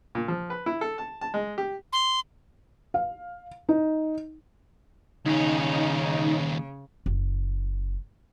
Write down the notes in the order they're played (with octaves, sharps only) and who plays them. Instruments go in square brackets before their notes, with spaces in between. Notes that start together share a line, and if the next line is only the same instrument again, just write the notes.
[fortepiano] A#2
F3
B4
E4
A4
A5
A5
G#3
G4
[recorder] C6
[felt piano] F5
D#4
[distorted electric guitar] D#2 C#4 [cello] C#3 [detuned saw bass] D#4
[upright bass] F#1